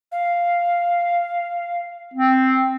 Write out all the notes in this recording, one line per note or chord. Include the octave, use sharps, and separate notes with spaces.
F5
C4